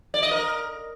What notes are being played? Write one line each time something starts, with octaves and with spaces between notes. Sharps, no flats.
D5
D#5
A#4